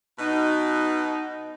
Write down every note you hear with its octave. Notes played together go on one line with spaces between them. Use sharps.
B2 D#4